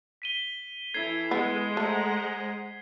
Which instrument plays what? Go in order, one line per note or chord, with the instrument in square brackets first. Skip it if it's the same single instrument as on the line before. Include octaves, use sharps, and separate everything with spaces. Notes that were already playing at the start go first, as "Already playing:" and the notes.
[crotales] B6 D#7 G7
[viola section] E3 E4 A4 [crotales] G#6 C7
[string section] G#3 [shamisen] B3
[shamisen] A3 [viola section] C5 F#5 A#5